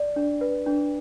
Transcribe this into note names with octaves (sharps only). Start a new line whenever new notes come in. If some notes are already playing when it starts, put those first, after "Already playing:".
Already playing: D5
D4
B4
D4